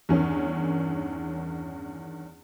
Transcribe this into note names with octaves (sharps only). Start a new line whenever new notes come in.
E2 G2 D#3 C#4